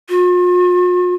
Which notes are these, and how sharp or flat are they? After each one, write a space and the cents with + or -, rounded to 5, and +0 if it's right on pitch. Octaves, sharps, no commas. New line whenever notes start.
F4 +45